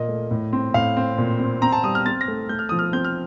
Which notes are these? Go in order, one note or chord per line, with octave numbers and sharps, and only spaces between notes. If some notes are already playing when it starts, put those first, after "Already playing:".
Already playing: A#2 A#3 D#5
A3
A2
C4
A2 F5
C4
A#2
C4
C4 A#5
A5
G3 D#6
F6
C4 A6
A#6
A3
A3 G6
F6
F3 D#6
F6
C4 G6
F6